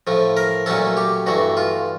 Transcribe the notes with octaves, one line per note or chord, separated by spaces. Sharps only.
A2 F3 A3
A#4
A#2 F#3 A3 C#4 A4
G4
G2 E3 A3 F#4
F4